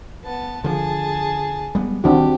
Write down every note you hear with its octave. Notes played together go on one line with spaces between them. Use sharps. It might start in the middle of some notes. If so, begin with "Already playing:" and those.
B3 A5
D3 F3 G#4 A5
G3 G#3 B3
D2 D#3 G3 C4 D4 F#4 G4